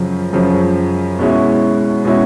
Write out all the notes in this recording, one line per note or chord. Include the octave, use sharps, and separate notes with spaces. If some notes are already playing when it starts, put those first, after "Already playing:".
Already playing: F#2 C#3 F3
F#2 C#3 F3
B2 G#3 C#4 E4
B2 G#3 C#4 E4